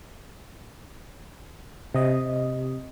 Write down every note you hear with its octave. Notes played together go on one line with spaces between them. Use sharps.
C3 D#5